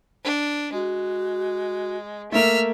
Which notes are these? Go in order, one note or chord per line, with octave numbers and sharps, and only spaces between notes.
D4
G#3 F#4
A3 A#3 E5 F6